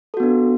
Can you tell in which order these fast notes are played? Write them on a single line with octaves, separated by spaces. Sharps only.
A4 F#4 B3 D4